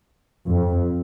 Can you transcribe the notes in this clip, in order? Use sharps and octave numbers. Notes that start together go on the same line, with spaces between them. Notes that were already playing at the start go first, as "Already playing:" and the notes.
F2